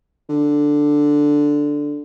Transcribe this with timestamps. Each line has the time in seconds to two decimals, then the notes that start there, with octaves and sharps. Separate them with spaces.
0.29 D3